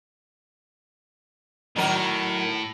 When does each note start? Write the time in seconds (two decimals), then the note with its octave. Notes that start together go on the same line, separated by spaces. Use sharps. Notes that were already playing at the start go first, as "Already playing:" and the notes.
1.76 A2 D#3 F#3 A#4